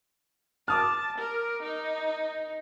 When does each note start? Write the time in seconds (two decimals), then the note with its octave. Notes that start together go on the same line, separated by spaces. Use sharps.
0.68 A5 D6 D#6 F6
1.19 A#4
1.63 D#4